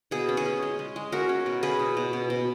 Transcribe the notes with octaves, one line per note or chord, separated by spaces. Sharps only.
B2 G#4
C#4
G#4
C#4
G#3
G#3
G#3
C#4 F#4 A#4
C#4
B2
C#4 G#4 B4
B2
B2
B2
B2